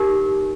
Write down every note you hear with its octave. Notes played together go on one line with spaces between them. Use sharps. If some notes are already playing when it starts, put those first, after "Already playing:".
Already playing: D#4 G4 A#4